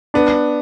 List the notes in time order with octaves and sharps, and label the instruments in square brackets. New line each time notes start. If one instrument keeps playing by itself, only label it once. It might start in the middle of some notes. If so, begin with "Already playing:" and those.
[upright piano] B3 [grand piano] D4